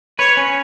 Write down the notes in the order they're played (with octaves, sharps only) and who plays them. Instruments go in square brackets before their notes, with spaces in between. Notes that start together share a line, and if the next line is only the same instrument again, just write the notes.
[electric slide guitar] B4 [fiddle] C#5
[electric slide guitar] C#4